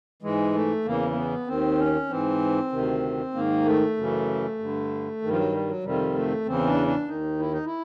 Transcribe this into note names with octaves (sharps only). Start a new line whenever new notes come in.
G#2 E3 G#3
A3
E2 C#3 E3 A#3
A#3
B3
D#2 D#3 C4
C#4
G#2 E3 C4
D2 C3 D#3
G#2 D#3 A#3
A3
F#2 C#3 E3
G2 D3
G2 D#3
F3
F#3
G3
F#3
F2 C3 D#3 G3
A3
E2 C#3 E3 C4
D4
D4
D#2 D#3 D#4
E4
D#4
E4